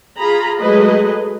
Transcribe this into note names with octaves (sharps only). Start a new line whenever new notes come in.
F4 G#4 A#5 B5
F#3 G#3 A3 G#4 B4 D#5